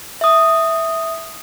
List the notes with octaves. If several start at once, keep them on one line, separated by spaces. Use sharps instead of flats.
E5 D#6